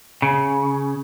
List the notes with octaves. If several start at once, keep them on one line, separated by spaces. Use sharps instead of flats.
C#3